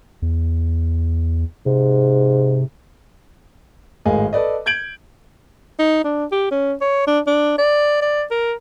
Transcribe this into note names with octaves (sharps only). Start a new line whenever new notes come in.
E2
G#2 C3
G#1 A2 G#3 A#4 F5 G#5
A4 B4 D5 D#5
G6 G#6 D7 F#7
D#4
D4
G4
C#4
C#5
D4
D4
D5
D5
A#4